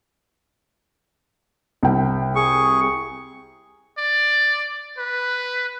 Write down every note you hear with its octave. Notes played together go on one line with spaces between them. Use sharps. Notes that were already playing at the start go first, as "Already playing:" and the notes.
C2 G5
G#4 C#6
D5
B4